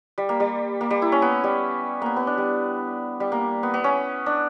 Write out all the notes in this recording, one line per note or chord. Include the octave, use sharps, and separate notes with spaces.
G3
A#3
G3
A#3
G3
E4
C#4
B3
G3
A#3 B3
B3
D4
G3
G3
A#3
B3
B3
C#4
D4